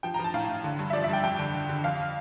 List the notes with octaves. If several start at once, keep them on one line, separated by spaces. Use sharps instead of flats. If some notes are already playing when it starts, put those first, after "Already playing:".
F3 G5
A#5
F3
A5
A2 F5
A2
D3
G2
E5
F3 D5
E5
G2 G5
F2 G5
D3
D3
D3
F2 F5